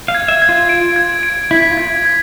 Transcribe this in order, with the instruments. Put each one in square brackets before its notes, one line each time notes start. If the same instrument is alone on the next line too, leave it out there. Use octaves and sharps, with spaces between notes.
[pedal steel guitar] F5
[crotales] G#6
[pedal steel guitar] E5
[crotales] G#6
[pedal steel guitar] F4
[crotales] D7
G#6
D7
[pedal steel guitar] E4 [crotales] B6
[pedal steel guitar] F4
[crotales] G#6
G#6